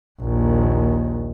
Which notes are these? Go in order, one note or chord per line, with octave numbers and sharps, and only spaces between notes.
A#1 D#2